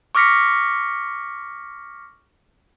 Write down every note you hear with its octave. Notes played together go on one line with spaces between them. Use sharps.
C#6 D6 F6 A#6 B6 C#7